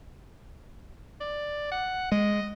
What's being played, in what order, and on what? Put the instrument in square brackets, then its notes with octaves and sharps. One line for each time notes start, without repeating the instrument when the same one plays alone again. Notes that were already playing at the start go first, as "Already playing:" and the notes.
[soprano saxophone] D5
F#5
[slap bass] G#3 [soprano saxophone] D#5